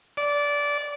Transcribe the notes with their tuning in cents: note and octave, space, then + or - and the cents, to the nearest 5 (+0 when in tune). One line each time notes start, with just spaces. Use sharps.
D5 -20